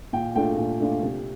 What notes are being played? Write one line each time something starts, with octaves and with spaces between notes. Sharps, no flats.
A#2 G5
A3 D4 F4 G5
A#2
A3 D4 F4
C3